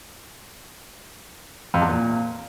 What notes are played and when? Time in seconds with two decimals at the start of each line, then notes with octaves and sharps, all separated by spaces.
1.74 F2
1.81 E2
1.89 A#2